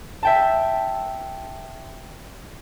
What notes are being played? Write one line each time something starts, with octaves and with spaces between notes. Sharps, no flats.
E5 G5 A5